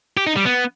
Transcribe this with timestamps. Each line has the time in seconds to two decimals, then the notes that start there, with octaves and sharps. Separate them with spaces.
0.17 G4
0.27 D#4
0.36 G3
0.45 B3